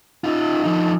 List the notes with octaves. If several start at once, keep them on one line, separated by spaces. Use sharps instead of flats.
D#4 F4
F3 D#4